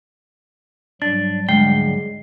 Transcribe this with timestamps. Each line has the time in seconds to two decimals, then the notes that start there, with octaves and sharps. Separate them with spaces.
1.02 G#2 F#3 G3 D4 A6
1.49 D2 G#3 G5 C7